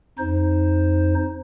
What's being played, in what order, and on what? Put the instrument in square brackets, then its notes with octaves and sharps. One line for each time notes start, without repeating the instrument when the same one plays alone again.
[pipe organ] F2 D#4 C5